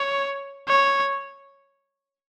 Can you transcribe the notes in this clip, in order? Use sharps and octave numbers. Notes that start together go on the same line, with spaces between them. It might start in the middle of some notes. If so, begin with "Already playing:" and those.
Already playing: C#5
C#5